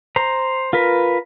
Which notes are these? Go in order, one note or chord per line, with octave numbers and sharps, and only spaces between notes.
C5 A#5
F4 A#4 B4